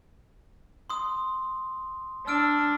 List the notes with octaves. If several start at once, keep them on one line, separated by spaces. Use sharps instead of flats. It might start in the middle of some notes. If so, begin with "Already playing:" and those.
C6 D#6
D4 E6 F6 D7